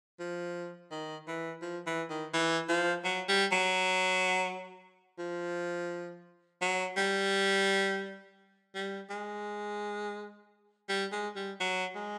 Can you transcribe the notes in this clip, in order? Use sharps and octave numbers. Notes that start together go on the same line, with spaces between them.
F3
D#3
E3
F3
E3
D#3
E3
F3
F#3
G3
F#3
F3
F#3
G3
G3
G#3
G3
G#3
G3
F#3
G#3